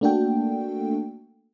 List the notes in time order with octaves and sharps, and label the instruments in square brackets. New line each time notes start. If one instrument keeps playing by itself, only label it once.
[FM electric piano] A3 A#3 D4 F#4 A4 G5